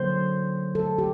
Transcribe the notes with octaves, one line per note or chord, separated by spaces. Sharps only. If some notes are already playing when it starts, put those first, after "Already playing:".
Already playing: D3 F#3 A#3 C5
A4
G4